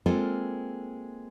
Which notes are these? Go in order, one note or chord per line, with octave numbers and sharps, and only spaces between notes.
G#3 A#3 C4 F4 A4